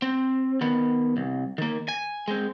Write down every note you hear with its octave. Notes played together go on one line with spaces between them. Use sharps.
C4
D#3 B3
C2
D#3 A#3
G#5
G#3 C4